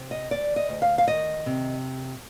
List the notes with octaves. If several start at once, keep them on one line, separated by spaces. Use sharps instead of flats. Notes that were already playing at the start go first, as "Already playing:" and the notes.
Already playing: C3
D#5
D2 D5
D#5
D2
F5
F5
D#3 D#5
C3